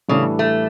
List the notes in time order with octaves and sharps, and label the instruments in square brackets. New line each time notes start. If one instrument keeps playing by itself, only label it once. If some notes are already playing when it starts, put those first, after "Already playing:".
[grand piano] A2 E3 G3 D4 A4 [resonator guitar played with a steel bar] C#3
[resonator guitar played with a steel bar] A3